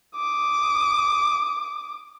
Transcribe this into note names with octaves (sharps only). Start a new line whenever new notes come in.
D6 D#6